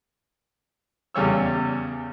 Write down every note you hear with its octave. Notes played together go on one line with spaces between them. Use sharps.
E2 C#3 G3 C#5 E6